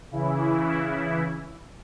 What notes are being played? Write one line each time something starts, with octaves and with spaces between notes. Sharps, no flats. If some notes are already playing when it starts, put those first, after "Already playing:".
C#3 E3 E4